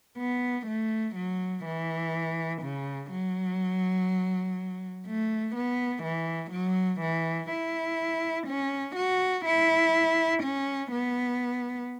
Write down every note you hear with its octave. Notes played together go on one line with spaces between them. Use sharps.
B3
A3
F#3
E3
C#3
F#3
A3
B3
E3
F#3
E3
E4
C#4
F#4
E4
C#4
B3